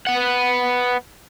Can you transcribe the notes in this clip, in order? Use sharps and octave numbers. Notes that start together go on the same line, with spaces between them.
B3 F#5